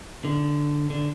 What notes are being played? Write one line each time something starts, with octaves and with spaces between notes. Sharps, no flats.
D3
D3